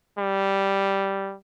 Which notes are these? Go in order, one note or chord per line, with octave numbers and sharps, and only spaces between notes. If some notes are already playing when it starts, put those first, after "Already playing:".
G3